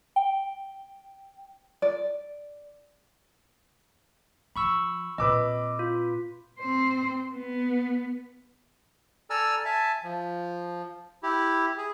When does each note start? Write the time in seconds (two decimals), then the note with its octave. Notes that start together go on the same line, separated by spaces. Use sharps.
0.16 G5
1.82 D5
4.56 F3 B5 C#6 E6
5.18 A#2 C4 B4 D#5 D6 E6
5.79 F4
6.59 C4 C5
7.35 B3
9.30 A4 D5 G#5 A#5 E6 F6
9.65 E5 G#5 A5
10.04 F3
11.23 E4 G4
11.78 G#4